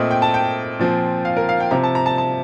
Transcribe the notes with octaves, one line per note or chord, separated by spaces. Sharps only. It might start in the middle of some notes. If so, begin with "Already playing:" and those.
Already playing: A#2 A3 C4 D#5
G5
A5
G5
A#2 F3 C4
F5
A#4
F5
G5
C3 F3 C4 A#5
A5
A#5
A5
A5